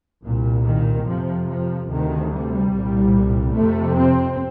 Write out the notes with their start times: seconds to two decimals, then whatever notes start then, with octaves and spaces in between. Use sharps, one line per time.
0.23 C2 A#2
0.65 D#3
1.06 F2 C3 F3
1.48 F3
1.89 D2 C3 D#3
2.31 G3
2.72 C2 A#2
3.55 F2 C3 A3
3.97 C4